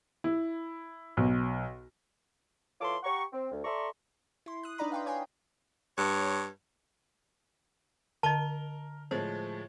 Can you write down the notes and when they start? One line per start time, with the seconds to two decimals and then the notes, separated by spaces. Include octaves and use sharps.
0.24 E4
1.17 B1
2.81 E3 F4 A4 C#5 C6 D6
3.03 G4 F#5 A#5 C#6
3.33 C4
3.52 D2
3.64 A4 D5 E5 A#5 C6 C#6
4.46 E4 C6
4.63 D#6 F#6
4.78 D4 D#4 B4 D5 A#5 B5
4.92 F5 G5 C6
5.06 C#5 G5 G#5 C6
5.97 G2 C#5
8.23 D3 A#4 D#5 A5 F7 G7
9.11 A2 F3 G#3 C5